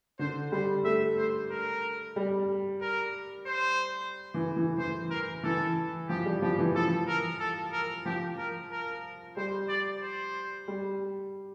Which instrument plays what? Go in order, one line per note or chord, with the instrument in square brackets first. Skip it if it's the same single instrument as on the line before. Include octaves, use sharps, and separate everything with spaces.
[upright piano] D3 [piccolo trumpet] C5
[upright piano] G3 [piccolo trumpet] C5
[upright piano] A3 [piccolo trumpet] E5
[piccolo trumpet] C5
A#4
[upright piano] G3
[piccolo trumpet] A#4
C5
[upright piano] E3
E3
[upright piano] E3 [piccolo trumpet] C5
[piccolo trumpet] A#4
[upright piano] E3 [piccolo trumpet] A4
[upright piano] F3 [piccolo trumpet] G4
[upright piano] G3
[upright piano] F3 [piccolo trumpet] G4
[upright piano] E3
[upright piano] F3 [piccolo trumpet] A4
[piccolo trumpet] A#4
A4
A#4
[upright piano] F3 [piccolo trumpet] G4
[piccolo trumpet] A#4
A#4
[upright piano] G3 [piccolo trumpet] C5
[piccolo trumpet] D5
C5
[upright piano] G3